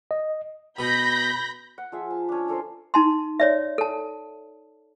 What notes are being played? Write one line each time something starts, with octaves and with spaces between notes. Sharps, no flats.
D#5
B2 B5 G6 A#6
F#5
F3 F4 G#4 E5
A5
C#4 D4
D4 A4 A#4 C5
D#4 A5 C6
C#5 D5 E5
A4 A5